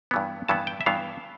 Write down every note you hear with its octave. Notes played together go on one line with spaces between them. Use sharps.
G2 E3 B3
G2 E3 B3 A5
G5
E5
G2 E3 B3 F5